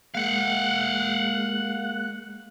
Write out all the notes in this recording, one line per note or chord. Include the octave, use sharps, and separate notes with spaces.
G#3 A#3 F5 F#5 F#6